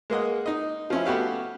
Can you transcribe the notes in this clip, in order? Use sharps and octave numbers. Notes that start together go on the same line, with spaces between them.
G#3 A#3 D#5 F#5
D#4 D#5
F3 C#4 E4
A3 B3 F#4 G4 F5